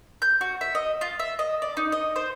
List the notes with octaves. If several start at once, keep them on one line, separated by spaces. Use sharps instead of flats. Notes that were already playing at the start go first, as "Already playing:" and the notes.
G6
F#4
E5
D#5
F4
E5
D#5
D5
D#4
D#5
C5